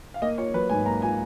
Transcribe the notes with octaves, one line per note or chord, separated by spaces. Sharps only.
F5
A#3 D#5
F4 C#5
F#3 B4
G#2 G#5
A#3 A#5
F4 G#5